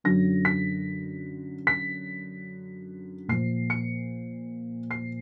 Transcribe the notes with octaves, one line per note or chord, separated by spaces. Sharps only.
F#2 D3 F#3 A#6
B6
B6
A#2 F3 C7
C#7
C7